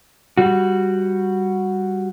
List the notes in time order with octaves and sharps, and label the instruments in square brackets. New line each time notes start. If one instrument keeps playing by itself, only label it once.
[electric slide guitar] G3 F#4